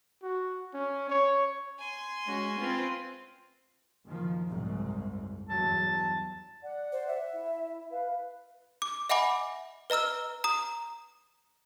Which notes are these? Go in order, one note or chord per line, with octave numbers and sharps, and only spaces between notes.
F#4
C#4
C#5
G#5 C6
G#3 C#4 F#4
C4 F4 B4
F#1 D#3 F3
F#1 C2 G#2
E2 G2 F#3 A5
D5 F#5
C5
E5
E4
B4 F5
D6
D#5 E5 F#5 G#5 B5 D6
B4 D#5 A#5 E6 F6
A#5 D#6